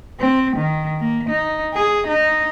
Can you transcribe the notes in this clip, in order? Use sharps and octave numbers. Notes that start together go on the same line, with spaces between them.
C4
D#3
A#3
D#4
G#4
D#4